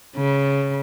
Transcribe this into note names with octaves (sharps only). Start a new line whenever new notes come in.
C#3